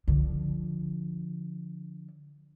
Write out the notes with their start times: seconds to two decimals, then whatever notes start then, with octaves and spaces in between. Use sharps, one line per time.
0.08 D3 F3